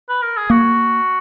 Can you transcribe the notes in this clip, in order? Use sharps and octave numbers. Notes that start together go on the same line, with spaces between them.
B4
A#4
G#4
A#3 F#4